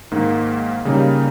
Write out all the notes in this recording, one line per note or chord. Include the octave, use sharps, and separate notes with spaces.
G#2 D#3 A#3 D#4
C#3 G3 A#3 D#4